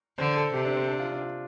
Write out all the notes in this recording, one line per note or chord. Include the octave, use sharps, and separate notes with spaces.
D3 C5
A4
C3 G4
D4
C4
D4
F4
D4
F4